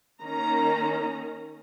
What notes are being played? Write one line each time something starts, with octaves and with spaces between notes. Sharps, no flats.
D#3 A#3 C#4 A#5